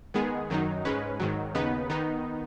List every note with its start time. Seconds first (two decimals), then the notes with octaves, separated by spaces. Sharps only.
0.14 D#3 G#3 B3 G#4
0.50 F#2 D#3 F#3 D#4
0.85 G#2 G#3 C#4 B4
1.20 G#2 D#3 F#3
1.55 D#2 C#3 B3 D#4 B4
1.90 D#3 B3 D#4